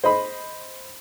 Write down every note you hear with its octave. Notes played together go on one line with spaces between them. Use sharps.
C5 D#5 B5